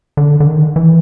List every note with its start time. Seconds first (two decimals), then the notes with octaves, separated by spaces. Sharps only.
0.17 D3
0.40 D3
0.47 D#3
0.76 E3